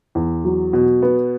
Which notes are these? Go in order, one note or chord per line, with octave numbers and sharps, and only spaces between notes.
E2
F#3
B2
B3